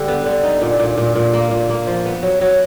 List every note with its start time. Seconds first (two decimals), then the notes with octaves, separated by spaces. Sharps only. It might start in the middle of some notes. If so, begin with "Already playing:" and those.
Already playing: D3 G3
0.08 B3
0.26 D3
0.43 D#4
0.62 A#2
0.80 A#2
0.98 A#2
1.16 A#2
1.34 A#3
1.51 A#2
1.69 A#3
1.87 F3
2.06 B3
2.23 F#3
2.41 F#3